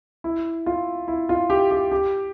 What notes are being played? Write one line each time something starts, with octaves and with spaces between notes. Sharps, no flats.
E4
F4
E4
F4
G4
G4
G4